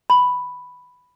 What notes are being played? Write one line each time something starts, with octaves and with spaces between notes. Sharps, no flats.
B5